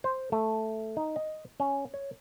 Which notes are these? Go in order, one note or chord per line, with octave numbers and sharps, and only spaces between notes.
C5
A3
D#4
D#5
C#4
C#5